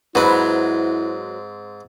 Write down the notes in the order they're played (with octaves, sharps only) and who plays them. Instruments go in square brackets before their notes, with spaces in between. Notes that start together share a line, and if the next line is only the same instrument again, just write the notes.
[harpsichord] G#2 C4 [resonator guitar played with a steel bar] F#3 B4 [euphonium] E4